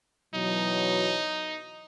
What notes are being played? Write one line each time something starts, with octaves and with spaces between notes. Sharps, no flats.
B2 E3 F#3 D#4